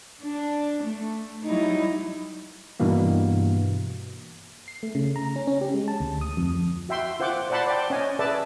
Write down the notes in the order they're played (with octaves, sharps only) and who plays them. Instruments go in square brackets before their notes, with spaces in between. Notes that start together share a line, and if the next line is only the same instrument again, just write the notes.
[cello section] D4
A3
F#3 G3 D#4 E4
[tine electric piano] G2 B2 E3 A#3
[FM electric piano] C7
A3
C#3
A#5
C#4
C#4
G4
G#3
A5
D2
D#6
F2
[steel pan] F#4 E5 G5 C6
F4 C5 F#5 G5 D6
C5 D5 F#5 A5 B5 C6
D5 G5
C#4 C#5 D#5 G#5
G#4 B4 D5 E5 A5